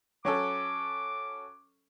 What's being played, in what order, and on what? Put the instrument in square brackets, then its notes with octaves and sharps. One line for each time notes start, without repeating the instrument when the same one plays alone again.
[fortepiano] F#3 C#4 A4 [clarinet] D6